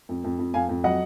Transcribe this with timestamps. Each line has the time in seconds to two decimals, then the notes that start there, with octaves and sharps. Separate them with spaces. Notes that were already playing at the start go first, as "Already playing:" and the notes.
0.09 F2
0.24 F2
0.39 F2
0.54 F2 F5 G#5
0.69 F2
0.84 F#3 D#5 F#5